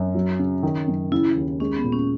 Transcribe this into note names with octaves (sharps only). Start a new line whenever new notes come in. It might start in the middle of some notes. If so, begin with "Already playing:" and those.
Already playing: F#2
F#3
C#3
D#3
F#2
C#3 E4
D#2
G#3 C#4
B3
A#2
C#4